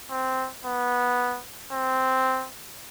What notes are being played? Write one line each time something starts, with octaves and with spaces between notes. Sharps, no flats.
C4
B3
C4